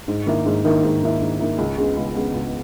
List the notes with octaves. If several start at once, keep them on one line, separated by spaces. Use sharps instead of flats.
G#2
D#3 A#3 E4
G#2
D#3 A#3 E4
G#2
D#3 A#3 E4
G#2
D#3 A#3 E4
C#2
C#3 G#3 B3
C#2
C#3 G#3 B3
C#2